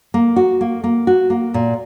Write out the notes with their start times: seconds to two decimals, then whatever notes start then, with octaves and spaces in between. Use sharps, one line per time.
0.14 A#3
0.36 F#4
0.61 A#3
0.84 A#3
1.07 F#4
1.30 A#3
1.54 A#2